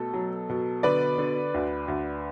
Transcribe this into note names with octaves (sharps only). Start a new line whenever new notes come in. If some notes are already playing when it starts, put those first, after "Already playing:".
Already playing: B2 A3 A4
F#3
B2
D3 B4 D5
D3
D2
D2